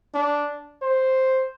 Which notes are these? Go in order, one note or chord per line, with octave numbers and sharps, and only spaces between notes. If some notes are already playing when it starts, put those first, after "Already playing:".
D4
C5